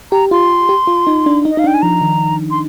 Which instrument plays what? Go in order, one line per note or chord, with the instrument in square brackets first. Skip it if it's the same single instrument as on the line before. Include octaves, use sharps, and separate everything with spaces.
[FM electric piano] G4 [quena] A#5
[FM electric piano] F4 [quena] C6
[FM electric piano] G4
F4
D#4
D4
D#4
[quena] D#5
[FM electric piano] D#4 [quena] F5
[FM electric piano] D4
[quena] G5
G#5
[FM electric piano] F3 [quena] A#5
[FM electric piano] D#3
[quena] C6